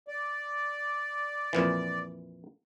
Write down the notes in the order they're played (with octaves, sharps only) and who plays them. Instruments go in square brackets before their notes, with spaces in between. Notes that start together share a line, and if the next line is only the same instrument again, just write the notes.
[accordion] D5
[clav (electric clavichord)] F2 A#2 E3